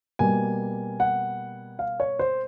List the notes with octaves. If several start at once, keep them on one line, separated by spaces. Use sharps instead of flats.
B2 G3 A#3 G#5
F#5
F5
C#5
C5